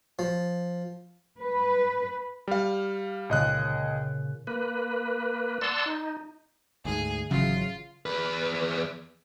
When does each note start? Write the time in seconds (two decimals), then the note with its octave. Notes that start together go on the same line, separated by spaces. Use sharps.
0.19 F3
1.41 B4
2.48 G3 F5
3.29 C#2 A#2 C#3 D#5 F#6
4.47 A#3 B4
5.61 D5 F#5 A5 C6 E6
5.86 D#4
6.85 D2 G#2 G#4
7.31 G#1 C#3 E3 F#3 F4
8.06 E2 B4